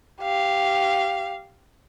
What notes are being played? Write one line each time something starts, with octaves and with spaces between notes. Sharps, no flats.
G4 F5